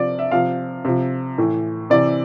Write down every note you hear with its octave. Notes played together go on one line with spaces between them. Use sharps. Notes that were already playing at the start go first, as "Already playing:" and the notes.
Already playing: C3 F3 D5
E5
C3 F3 F5
C3 F3
A2 E3
C3 E3 D5